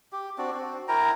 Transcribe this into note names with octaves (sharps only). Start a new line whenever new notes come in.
G4
C4 D4 F#4
C4 F#4
E4 A#4 G5 A#5